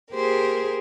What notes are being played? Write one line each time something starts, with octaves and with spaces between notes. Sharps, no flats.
A#3 G4 G#4 A#4 C5